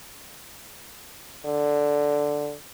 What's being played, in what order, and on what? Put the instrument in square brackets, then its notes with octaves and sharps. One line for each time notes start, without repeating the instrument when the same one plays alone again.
[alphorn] D3